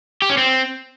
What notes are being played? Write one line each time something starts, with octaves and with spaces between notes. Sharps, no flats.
G4
C#4
C4